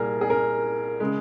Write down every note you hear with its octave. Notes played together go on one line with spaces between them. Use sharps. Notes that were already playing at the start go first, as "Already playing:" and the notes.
Already playing: C2 A#2 G3 G#4 A#4
G#4
A#4
C#3 G#3